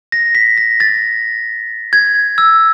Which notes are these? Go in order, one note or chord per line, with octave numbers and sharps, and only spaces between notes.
A#6
B6
A#6
A6
G#6
E6